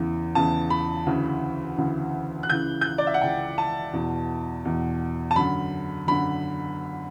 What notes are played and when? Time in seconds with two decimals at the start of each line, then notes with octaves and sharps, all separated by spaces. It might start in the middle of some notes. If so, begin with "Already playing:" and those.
Already playing: E2 C#3 E3
0.35 E2 C#3 E3 A5
0.70 B5
1.06 D2 C#3 E3
1.78 D2 C#3 E3
2.43 F#6
2.50 C#2 C#3 E3 G6
2.81 G6
2.85 F#6
2.98 D5
3.07 E5
3.14 F#5
3.21 C#2 C#3 E3 G5
3.58 A5
3.93 E2 B2
4.65 E2 B2
5.31 A5
5.36 F#2 D3 B5
6.07 F#2 D3 B5